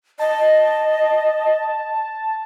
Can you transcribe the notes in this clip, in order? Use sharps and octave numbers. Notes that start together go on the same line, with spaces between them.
D#5 A5